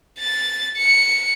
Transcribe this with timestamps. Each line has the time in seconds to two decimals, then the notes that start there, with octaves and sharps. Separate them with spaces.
0.19 A6
0.77 C#7